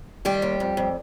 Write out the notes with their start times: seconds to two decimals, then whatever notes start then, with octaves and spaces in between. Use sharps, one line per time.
0.25 D#3 G3 G4
0.42 D#2
0.60 F2
0.77 F2